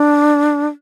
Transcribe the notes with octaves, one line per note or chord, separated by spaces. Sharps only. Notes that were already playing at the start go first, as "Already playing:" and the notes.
Already playing: D4